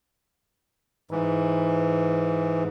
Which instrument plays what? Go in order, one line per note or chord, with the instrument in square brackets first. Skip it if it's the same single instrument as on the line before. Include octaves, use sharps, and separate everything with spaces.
[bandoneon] G#2 E3